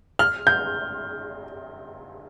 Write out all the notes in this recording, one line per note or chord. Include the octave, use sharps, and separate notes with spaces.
F6
G6